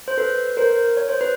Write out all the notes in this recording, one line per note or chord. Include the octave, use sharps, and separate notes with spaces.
C5
A4 B4
A#4 C5
C#5
C5
B4